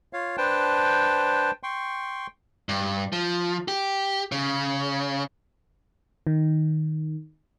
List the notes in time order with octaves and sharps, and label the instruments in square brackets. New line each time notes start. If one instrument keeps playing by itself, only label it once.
[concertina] F4 C#5 F5
D4 B4 C5 G5 A5
G5 C6 C#6
[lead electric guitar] G2
F3
G4
C#3
[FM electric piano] D#3